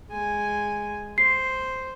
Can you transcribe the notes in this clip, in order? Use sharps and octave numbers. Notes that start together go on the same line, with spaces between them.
G#3 G#5
C5 C7